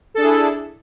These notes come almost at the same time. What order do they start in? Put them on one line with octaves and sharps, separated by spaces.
A4 D4 G#4 E4